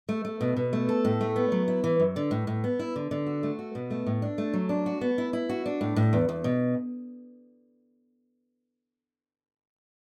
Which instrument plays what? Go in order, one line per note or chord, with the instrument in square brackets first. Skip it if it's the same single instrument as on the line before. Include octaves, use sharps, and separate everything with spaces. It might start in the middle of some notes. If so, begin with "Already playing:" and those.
[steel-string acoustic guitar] A3
A3
B2
B2
A3
A4
A2
A3
B3
F#3
E4
E3
F#2
D3
A2
A2
B3
E4
D3
D3
F#4
A3
F#4
B2
A3
A2
D4
A3
F#3
D4
F#4
B3
E4
E4
F#4
D4
A2
A2
E2
E2
B2